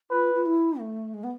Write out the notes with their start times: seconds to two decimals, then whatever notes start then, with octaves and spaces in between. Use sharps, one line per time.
0.10 F4 B4
0.34 F4
0.45 E4
0.79 A3
1.13 G#3
1.23 B3